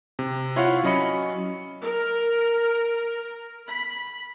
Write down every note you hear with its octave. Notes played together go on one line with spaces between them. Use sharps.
C3
E4 F4 C#5 F5 F#5
F#3 C#4 D#5 B5 C#7
A#4
B5